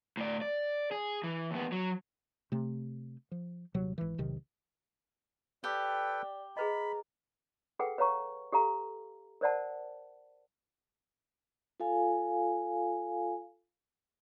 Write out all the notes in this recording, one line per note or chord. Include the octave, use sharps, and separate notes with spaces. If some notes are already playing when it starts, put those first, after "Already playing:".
A2 D5
D5
G#4
E3
D#2 B3
F#3
C3 A3
F3
D#1 C3 F#3
G#1 E3
E1 B1 C3 D#3
G4 A4 B4 D5 G5
G#4 B4 D#5 A#5 B5
G#4 A4 B4 F#5 G5
B4 C#5 F5 A#5 C#6
G4 A4 F5 A#5
A#4 C5 D5 F#5 A5
F4 A4 F5 G#5